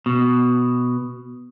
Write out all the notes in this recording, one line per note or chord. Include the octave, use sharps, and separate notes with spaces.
B2